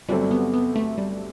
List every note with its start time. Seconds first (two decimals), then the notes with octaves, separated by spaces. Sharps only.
0.09 G1 G2 F#3 G3 A3 C4
0.31 B3
0.53 B3
0.76 A3
0.98 G3